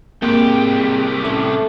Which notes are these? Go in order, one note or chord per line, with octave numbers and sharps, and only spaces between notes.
C2 A#3 C4 G4 G#4 G5
A2 A3 C#4